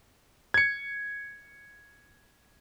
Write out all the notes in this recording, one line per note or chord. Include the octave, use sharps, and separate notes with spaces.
G#6 C#7